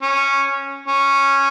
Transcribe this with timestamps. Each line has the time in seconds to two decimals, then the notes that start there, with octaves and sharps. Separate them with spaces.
0.02 C#4
0.88 C#4